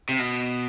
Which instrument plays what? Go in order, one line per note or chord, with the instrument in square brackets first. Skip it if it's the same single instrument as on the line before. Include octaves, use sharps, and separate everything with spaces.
[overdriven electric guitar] C3
B2